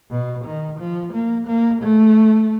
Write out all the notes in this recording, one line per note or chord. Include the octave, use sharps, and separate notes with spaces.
B2
D#3
F3
A#3
A#3
A3